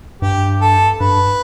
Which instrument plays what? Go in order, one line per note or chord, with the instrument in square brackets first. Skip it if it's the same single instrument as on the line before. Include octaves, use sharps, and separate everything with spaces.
[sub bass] G2 [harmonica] G4
[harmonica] A4
[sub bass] G2 [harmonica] B4